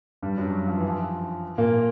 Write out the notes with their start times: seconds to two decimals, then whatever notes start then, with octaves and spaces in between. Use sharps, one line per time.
0.22 G2 G3
0.37 F#2 F#3
0.68 F3
0.78 E3
0.89 F3
1.58 A#2 A#3